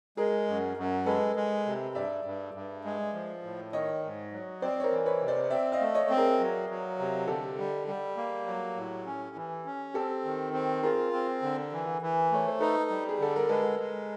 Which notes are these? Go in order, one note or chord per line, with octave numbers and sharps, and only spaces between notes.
G#3 G#4 A#4
F#2
F#2
G#3 A4 B4
G#3
C3
G2 D5 E5
G2
G2
G#3
F3
A2
D#3 C#5 D#5
G#2
F#3
C4 C5 D5
C#5
A#4 C5
E3
B4 C#5
C3
C5 D5
C4 D5 E5
D#5 F5
A3
C#5 D#5
C4
G#4 A#4
F#3
F#3
C3
D3 G4 A4
G3
G3
A#3
F#3
A2
C#4
E3
C#4
C4 G4 A4
D#3
C4
F4 G#4 A#4
C4
D3
E3
E3
A3 C#5
C5
D#4 A4 B4
G3
G#4
D3 A4
A#4
G#3 A4 B4
G#3